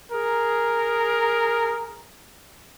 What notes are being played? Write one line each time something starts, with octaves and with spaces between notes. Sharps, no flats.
G#4 A#4